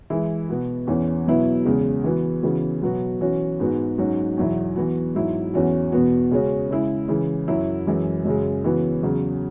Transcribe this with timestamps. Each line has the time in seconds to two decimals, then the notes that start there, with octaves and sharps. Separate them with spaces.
0.10 E3 G#3 E4
0.49 B2 B3 F#4
0.87 E2 E3 C#4
1.26 B2 F#3 B3 E4
1.65 E2 C#3 G#3
2.04 E3 B3 F#4
2.43 C#3 E3 B3 F#4
2.82 B2 F#3 B3 F#4
3.21 E3 C#4 F#4
3.59 G#2 G#3 B3 F#4
3.98 G#2 F#3 C#4 F#4
4.37 E2 B2 F#3 E4
4.76 E3 B3 F#4
5.14 G#2 F#3 E4
5.54 E2 E3 C#4 F#4
5.92 E2 B2 B3 F#4
6.31 C#3 G#3 C#4 F#4
6.71 C#3 G#3 E4
7.08 C#3 E3 G#3
7.48 F#2 F#3 E4
7.87 F#2 E3 G#3
8.25 F#2 C#3 G#3
8.64 C#3 E3 B3 F#4
9.03 E2 C#3 F#3